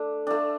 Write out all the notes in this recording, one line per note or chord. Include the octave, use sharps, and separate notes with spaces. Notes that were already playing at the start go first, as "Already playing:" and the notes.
Already playing: A3 D4
A3 D4